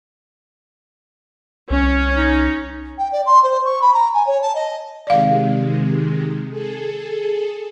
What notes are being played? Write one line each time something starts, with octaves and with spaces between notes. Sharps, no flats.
C2 C#4
D#4
G5
D5
C6
C5
C#6
B5
A#5
G#5
C#5
A5
D#5
C3 D#3 G#3 D5 F5
G#4 A4